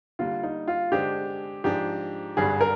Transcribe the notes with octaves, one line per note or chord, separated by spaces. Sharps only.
D3 G3 A#3 F4
D#4
F4
D3 G#3 D4 G4 G#4 C5
G#2 F3 G#3 D4 G4 G#4
G#1 G2 D3 G3 G#4
A#4